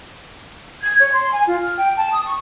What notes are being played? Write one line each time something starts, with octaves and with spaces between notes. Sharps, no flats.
G#6
C#5
C6
G#5
F4
F6
G5
A5
D#6
C#6